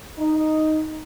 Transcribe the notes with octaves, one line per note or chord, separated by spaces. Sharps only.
D#4